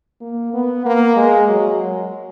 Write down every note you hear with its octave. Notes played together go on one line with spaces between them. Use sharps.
A#3
B3
A#3
G#3
F#3